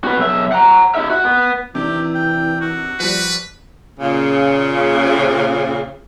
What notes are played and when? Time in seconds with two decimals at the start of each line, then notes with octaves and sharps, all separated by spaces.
0.04 F#4 B4
0.18 B1 E5
0.52 F#5 A#5
0.95 D#4 E5
1.10 F#4
1.25 B3
1.75 C3 D#3 E3 D4 G4
2.15 G5
2.61 F#4
3.00 F3 G3 B4
4.00 A#2 C#3